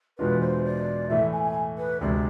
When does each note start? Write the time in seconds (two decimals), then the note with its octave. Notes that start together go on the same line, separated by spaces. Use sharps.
0.19 E2 B2 G#3 D4 F4 B4
0.41 C5
0.65 D5
1.09 A2 E3 A3 E5
1.33 G#5
1.43 G#5
1.78 B4
2.01 D2 C3 G#3 D5